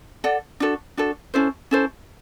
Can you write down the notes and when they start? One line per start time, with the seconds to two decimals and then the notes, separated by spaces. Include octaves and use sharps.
0.24 A4 D5 F#5
0.60 D4 F#4 A4
0.97 D4 F#4 A4
1.34 C#4 E4 A4 C5
1.71 C#4 E4 A4 C5